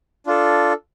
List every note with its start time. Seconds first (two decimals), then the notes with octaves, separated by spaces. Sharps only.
0.26 D4 F4 A4